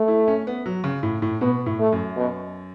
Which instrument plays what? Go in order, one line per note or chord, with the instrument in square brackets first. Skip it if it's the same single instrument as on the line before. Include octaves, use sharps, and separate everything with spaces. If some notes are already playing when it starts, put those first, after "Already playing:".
Already playing: [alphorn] A3
[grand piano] E4
C#4
B3
F#3
C#3
A2
A2
[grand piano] B2 [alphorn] B3
[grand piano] A2
[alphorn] A3
[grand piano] F#2
[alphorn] B2